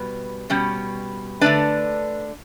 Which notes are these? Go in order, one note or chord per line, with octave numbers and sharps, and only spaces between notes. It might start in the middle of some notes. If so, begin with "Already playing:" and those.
Already playing: B2 G3 B4
B2 G3 C#4
D3 A3 D4 B4 D5